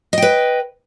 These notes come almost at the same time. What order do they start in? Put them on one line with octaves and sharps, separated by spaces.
D#5 G5 B4